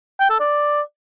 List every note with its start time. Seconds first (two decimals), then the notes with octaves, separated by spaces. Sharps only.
0.20 G5
0.30 A4
0.40 D5